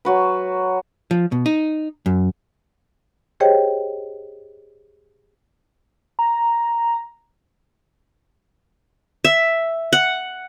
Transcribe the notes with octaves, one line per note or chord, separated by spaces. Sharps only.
F#3 F#4 B4
F3
B2
D#4
F#2
G4 G#4 C5 C#5 D#5 G5
A#5
E5
F#5